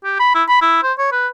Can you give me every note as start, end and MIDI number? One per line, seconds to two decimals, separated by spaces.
0.04 0.18 67
0.20 0.31 83
0.35 0.43 64
0.48 0.61 83
0.62 0.79 64
0.83 0.93 72
0.98 1.09 73
1.12 1.27 71